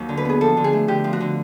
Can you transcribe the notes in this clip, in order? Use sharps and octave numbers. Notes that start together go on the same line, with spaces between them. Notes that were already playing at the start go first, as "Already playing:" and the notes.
Already playing: D#2 F#3
D3
B4
B3 G#4
F3 A4
D3
G#4
A3
D3 G4
F3
F#4
D3